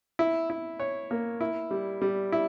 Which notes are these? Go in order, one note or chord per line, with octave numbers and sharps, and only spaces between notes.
E4
E4
C#5
A#3
E4
G3
G3
E4